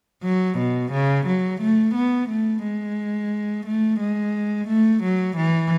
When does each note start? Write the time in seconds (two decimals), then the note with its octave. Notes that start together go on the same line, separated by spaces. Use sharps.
0.23 F#3
0.58 B2
0.92 C#3
1.26 F#3
1.61 A3
1.95 B3
2.29 A3
2.63 G#3
3.66 A3
4.00 G#3
4.68 A3
5.03 F#3
5.37 E3